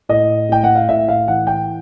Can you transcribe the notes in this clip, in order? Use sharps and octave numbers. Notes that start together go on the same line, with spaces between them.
A2 D#5
A2 G5
F#5
F5
A2 E5
F5
E3 F#5
G5